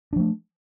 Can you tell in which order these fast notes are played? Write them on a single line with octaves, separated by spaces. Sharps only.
D4 F3 A3